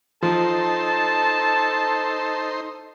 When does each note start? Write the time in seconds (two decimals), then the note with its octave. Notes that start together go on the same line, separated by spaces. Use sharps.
0.22 F3 D#4 A4 C5 A5